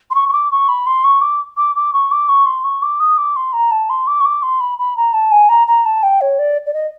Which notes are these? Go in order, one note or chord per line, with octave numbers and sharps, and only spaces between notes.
C6
C#6
C#6
D6
C#6
B5
C6
C#6
D6
D6
D6
C#6
D6
C#6
C6
C#6
D6
D#6
D6
C6
A#5
A5
C6
D6
C#6
D6
C6
B5
B5
A#5
A5
G#5
A#5
A#5
A5
G5
C#5
D5
D5
D#5